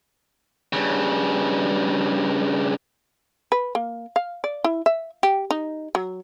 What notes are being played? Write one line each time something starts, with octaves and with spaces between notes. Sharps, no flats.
G2 C#3
B4
A#3
F5
D5
E4
E5
G4
D#4
F#3